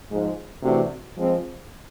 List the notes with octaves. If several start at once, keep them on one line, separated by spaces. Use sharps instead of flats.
G#2 F3 G#3
C3 E3 A3 D4 F#4
F3 G#3 C4